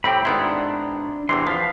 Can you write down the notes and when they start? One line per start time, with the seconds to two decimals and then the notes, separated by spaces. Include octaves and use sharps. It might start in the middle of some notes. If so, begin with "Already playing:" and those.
0.04 A2 C4 G4 G5 B5
0.25 G#1 B3 D4 E4 A#5 C6
1.29 E2 C3 E3 C6
1.47 F3 B4 F5